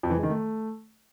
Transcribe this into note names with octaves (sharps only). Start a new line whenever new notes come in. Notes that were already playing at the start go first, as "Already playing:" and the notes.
F2
E3
G#3
D#3
A3